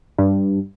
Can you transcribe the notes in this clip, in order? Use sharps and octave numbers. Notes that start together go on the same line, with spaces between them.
G2